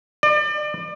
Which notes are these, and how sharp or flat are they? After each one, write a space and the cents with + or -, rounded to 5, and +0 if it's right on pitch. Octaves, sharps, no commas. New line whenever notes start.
D5 +35